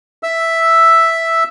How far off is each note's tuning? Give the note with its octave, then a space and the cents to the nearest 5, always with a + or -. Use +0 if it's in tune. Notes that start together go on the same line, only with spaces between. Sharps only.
E5 +0 E6 +0